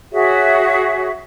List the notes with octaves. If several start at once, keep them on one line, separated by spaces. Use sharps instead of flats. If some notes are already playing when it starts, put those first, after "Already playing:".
F#4 G#4 C#5 E5